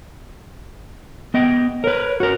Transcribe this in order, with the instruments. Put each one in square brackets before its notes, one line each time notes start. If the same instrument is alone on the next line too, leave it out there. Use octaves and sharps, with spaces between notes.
[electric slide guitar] B3 D#5 G5
[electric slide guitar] A#4 B4 [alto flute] C#5
[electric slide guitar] F#4 A#4